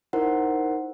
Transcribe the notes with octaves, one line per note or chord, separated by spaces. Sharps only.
D#4 E4 A#4 C5 F#5